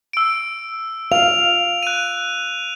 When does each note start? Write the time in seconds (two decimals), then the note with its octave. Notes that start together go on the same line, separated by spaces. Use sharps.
0.13 E6 D7
1.12 F5 F7
1.83 F#6 D#7